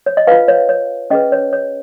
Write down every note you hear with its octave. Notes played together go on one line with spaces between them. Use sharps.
C#5
D#5
F4 B4 F5
C#5
C#5
C#4 G#4 B4 D#5
C#5
C#5